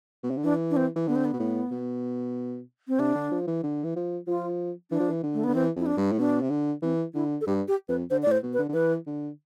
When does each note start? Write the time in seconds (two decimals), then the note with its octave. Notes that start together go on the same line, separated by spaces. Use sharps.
0.23 B2
0.30 C3
0.37 D3
0.44 E3 D4
0.71 D4
0.76 C4
0.96 E3
1.07 D3 B3
1.16 C4
1.25 B3
1.33 B2
1.39 A2
1.71 B2
2.88 C4
2.99 C3 D4
3.15 D3
3.31 F3
3.47 E3
3.63 D3
3.84 E3
3.96 F3
4.27 F3 F4
4.91 E3 D4
5.00 F3
5.09 E3
5.23 D3
5.34 A3
5.44 D3 B3
5.55 E3 C4
5.76 F2 E4
5.86 D4
5.97 G2
6.12 A2
6.18 B2 D4
6.42 C3
6.50 D3
6.82 E3 C4
7.14 D3 E4
7.41 A4
7.47 G2 G4
7.68 G4
7.89 F2 B4
8.10 D3 C5
8.23 A2 D5
8.31 C5
8.43 B2
8.53 B4
8.59 D3
8.69 D3
8.73 E3 B4
9.07 D3